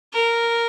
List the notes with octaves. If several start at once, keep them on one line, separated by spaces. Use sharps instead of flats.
A#4